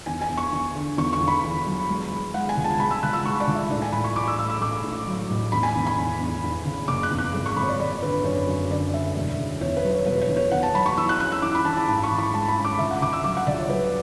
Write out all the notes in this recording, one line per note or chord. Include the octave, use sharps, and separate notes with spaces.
E2 G#5
G#5
E2
C#6
E2
D3
E2 C#6
C#6
E2
B5
E2
F#3
G#3
G#3
G#3 F#5
G#5
C#2
A5
G#3 B5
E6
C#2 F#6
E6
G#3 C#6
D5
C#2
E5
A2 D5
G#5
A1 B5
C#6
A1 D6
E6
A1 E6
E6
A1 D6
A2
F#3
A1
E2 B5
G#5
E2
B5
E2
E2
E2
C#3
F#1 D6
F#6
E2
F#6
G#1
C#6
G#1 B5
C#5
D5
G#1 D5
D3 B4
F#2 C#5
F#2
D3 D5
D3 E5
E1
C#3
E2 C#5
B4
F#3
C#5
E1 B4
C#5
E2
C#5
E2 F#5
A5
F#3 B5
C#6
E3 E6
F#6
C#4 F#6
E6
E3 D6
B5
E3 A5
A5
G#2 B5
C#6
E3
B5
G#3 A5
B5
C#4
D6
C#2 E5
F#5
C#2 D6
E6
F#3 D6
F#5
C#2 D5
C#5
F#3 B4